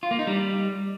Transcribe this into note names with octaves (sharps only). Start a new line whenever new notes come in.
F4
A#3
D#4
G3